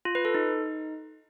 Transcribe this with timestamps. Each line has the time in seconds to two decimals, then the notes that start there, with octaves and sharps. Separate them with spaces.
0.05 F4
0.15 B4
0.25 A4
0.35 D#4